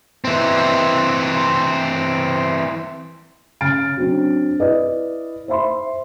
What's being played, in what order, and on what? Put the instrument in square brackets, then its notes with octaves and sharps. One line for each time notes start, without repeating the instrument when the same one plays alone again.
[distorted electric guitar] E3 C4
[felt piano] C#3 F6 A6 D7
F#3 C4 D4
E4 B4 D5 D#5
C5 E5 B5 C6